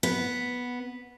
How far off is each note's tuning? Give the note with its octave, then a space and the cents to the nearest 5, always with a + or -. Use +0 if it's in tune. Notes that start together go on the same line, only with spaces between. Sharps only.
B3 -5